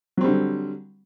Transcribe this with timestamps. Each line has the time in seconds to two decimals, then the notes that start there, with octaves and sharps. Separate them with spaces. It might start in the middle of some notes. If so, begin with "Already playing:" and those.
0.17 F#3
0.21 C4
0.24 G3
0.27 D3